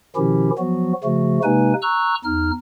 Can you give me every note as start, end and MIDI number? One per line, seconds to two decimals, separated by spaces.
0.16 0.50 47
0.16 0.50 51
0.16 0.50 53
0.16 0.50 61
0.16 0.50 64
0.16 0.50 67
0.58 0.93 53
0.58 0.93 54
0.58 0.93 59
0.58 0.93 66
1.04 1.39 49
1.04 1.39 53
1.04 1.39 57
1.04 1.39 66
1.44 1.73 48
1.44 1.73 56
1.44 1.73 58
1.44 1.73 63
1.44 1.73 71
1.44 1.73 80
1.82 2.15 82
1.82 2.15 85
1.82 2.15 88
1.82 2.15 90
2.24 2.51 40
2.24 2.51 63
2.24 2.51 89